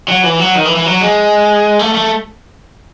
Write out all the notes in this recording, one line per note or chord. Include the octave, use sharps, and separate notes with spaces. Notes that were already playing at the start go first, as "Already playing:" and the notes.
F#3
E3
F#3
D#3
E3
E3
F#3
G#3
A3
A3